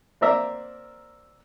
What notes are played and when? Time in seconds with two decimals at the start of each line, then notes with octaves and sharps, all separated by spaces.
0.21 A#3 C4 A#4 D5 E5 A#5